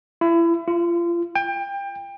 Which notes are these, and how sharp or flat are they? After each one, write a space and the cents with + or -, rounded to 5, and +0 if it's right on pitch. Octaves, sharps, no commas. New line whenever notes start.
E4 +30
F4 -30
G5 +25